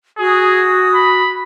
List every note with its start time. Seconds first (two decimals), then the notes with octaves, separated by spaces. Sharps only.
0.18 F#4 G#4 D#6 E6
0.95 B5